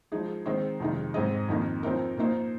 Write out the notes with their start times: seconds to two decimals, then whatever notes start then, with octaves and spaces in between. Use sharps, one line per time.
0.12 F3 G#3 D#4 G#4
0.46 D#3 G#3 C4 D#4 C5
0.80 F2 C3 D#3 G#3 D#4
1.14 G#2 G#3 C4 G#4 D#5
1.48 F2 D#3 A#3 D#4
1.83 F3 C4 D#4 A#4
2.17 A#2 A#3 D#4 C5